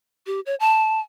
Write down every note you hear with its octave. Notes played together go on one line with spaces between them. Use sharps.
G4
C#5
A5